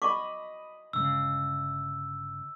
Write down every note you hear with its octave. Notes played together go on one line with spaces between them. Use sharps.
D#5 B5 C#6 D6
G1 C#3 G#3 E6